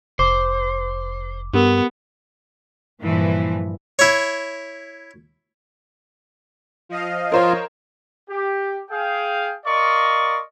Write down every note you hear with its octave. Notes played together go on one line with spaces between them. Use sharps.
F1 C5 D6
G2 B3 G4 A#4
G2 A#2 E3 F3
E4 C#5
F3 D#5 F5
F4 A#4 C5 C#5
G4
G#4 F5 G5
A#4 D5 D#5 F5 C6 C#6